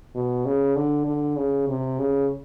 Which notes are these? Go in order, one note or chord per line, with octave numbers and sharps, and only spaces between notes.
B2
C#3
D3
D3
C#3
C3
C#3